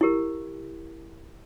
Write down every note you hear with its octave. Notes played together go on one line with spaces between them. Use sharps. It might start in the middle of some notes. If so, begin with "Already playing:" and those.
E4 G4 A#4